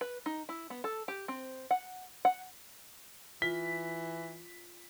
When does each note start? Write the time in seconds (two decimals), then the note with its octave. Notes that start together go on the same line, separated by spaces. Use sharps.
0.01 B4
0.26 D#4
0.49 E4
0.70 B3
0.84 A4
1.08 G4
1.28 C4
1.71 F#5
2.25 F#5
3.42 E3 F4 B6